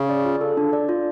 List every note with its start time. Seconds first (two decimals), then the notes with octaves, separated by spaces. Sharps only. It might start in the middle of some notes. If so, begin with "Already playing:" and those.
Already playing: C#3
0.09 D5
0.25 F4
0.41 A4
0.57 D4
0.73 D5
0.89 F4